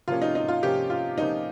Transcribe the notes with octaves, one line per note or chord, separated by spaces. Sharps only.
C3 F3 A#3 C#4 F4
D#4
D#4
F4
C3 F3 A#3 C#4 G4
F4
C3 F3 A#3 C#4 D#4